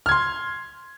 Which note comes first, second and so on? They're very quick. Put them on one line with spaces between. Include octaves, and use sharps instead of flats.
F6 G#6 C6